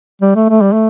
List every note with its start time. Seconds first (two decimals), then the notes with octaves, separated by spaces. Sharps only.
0.22 G3
0.35 A3
0.50 A3
0.61 G3
0.72 A3